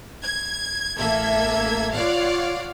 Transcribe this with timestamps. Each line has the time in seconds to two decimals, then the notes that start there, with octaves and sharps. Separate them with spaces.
0.23 G#6
0.97 A1 A#3 A4 E5 G#6
1.94 F4 C#5 D5 F5 F#5